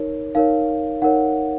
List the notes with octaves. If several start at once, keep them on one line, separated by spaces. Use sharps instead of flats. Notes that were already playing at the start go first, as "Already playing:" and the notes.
Already playing: D#4 A#4 C#5
D#4 A#4 C#5 F5
D#4 A#4 C#5 F#5